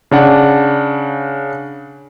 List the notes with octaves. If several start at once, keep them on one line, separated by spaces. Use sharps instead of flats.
C#3 D4 F#5